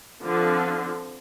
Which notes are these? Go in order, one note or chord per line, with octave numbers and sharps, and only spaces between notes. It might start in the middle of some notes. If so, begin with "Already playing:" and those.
D3 F3 C4